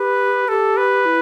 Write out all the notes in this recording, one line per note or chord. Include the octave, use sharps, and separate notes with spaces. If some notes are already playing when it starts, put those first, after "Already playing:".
Already playing: G4 B4
G4 A4
B4
E4